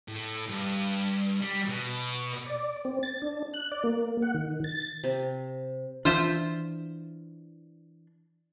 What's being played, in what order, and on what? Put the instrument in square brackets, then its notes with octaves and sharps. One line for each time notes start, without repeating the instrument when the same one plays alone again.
[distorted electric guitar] A2
G2
G3
B2
[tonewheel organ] D5
C4
A6
D4
F#6
D5
A#3
F#5
D#3
A6
A6
[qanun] C3
[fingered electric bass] E3 D4 [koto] F4 C5 E5